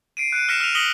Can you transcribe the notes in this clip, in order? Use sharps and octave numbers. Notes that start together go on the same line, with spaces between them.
C7 D7 D#7
F#6 C#7 D#7
E6 F6 A#6 B6 C#7 E7
E6 F6 B6 D#7 F7
D#6 A#6 B6 C#7 F#7 G7